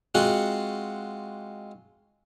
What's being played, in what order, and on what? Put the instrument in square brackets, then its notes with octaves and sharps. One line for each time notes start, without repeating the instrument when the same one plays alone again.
[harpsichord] G#3 C4 F4 F#4 F#5